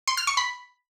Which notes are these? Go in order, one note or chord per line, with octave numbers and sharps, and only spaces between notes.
C6
F6
C#6
B5